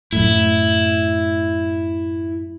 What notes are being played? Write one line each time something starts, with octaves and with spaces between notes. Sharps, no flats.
F#2 A2 E4